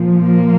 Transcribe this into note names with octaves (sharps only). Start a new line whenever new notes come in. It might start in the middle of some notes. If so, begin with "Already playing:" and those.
Already playing: A#2 F3
A#3